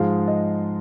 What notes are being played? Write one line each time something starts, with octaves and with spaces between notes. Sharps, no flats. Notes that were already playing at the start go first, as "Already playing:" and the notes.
Already playing: G#2 F3 G#3 F5
D#5